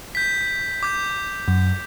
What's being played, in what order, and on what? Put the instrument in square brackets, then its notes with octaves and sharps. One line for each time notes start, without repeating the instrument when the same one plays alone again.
[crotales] G6 B6
D6 G6
[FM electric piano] F#2